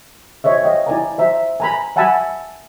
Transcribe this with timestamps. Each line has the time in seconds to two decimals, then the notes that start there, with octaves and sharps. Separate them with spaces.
0.44 C5 C#5 D#5 E5
0.62 D#5 F5 G5
0.86 E4 D5 G#5 A#5
1.18 C5 E5 A#5
1.60 G#5 A#5 B5
1.96 E5 F#5 G#5 A5 B5 E6